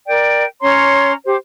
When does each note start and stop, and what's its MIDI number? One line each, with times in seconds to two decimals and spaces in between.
0.07 0.45 70
0.07 0.45 74
0.07 0.45 79
0.62 1.13 61
0.62 1.13 73
0.62 1.13 82
0.62 1.13 84
1.25 1.36 67
1.25 1.36 72